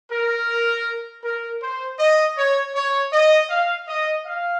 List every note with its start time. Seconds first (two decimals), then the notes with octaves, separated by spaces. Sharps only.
0.11 A#4
1.23 A#4
1.62 C5
1.99 D#5
2.36 C#5
2.75 C#5
3.13 D#5
3.50 F5
3.87 D#5
4.25 F5